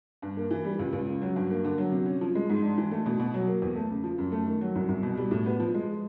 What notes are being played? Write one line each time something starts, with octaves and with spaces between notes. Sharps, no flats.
G2
A#3
E3
G3
C#2
C#2
C#3
F#3
G2
A#3
D3
F#3
C3
C#4
F3
G#3
G#2
D4
E3
A3
B2
B2
F#3
A#3
E2
A3
C#3
F3
F#2
A3
D#3
F#3
C2
C2
B2
G3
A2
B3
F3
G#3